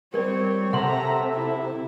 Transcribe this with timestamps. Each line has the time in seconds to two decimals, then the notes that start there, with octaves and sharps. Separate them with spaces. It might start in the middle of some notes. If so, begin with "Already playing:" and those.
0.14 G3 C4 A#4 C#5 D5
0.73 C3 A4 E5 F#5 A#5 C6
1.34 E4